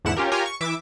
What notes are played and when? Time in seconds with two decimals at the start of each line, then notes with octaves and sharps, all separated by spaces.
0.05 E2 G#2 D3 E4 F#5 E7
0.16 C#4 F4 G4 A#4
0.32 F4 G4 A#4 C#5 G#5 A#5
0.46 C#6
0.61 E3 E5 D6